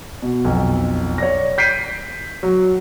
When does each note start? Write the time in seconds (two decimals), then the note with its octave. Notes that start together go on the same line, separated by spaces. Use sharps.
0.22 B2
0.44 B1 F2
1.18 C#5 D5 A#6
1.58 G6 B6 C7 D7 D#7
2.43 F#3